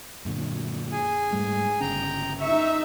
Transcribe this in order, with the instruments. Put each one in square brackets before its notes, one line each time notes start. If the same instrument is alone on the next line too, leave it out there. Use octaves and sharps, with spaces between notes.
[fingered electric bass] F#2 A#2 D3
[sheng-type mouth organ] G#4 G#5
[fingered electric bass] G#2 G3 A3
[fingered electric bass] G1 C#3 C#4 [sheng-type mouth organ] G5 A#5
[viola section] D#4 E5 [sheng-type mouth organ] C#6